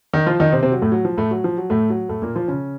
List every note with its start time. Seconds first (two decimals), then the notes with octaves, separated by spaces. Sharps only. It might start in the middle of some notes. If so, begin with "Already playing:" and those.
0.13 D#3 D#4
0.26 F3 F4
0.40 D#3 D#4
0.52 C3 C4
0.63 C3 C4
0.72 F#3
0.81 A2 A3
0.92 F#3
1.05 F3
1.18 A2 A3
1.31 F#3
1.44 F3
1.58 F#3
1.70 A2 A3
1.90 F#3
2.09 A2 A3
2.22 A#2 A#3
2.35 F3 F4
2.48 C#3 C#4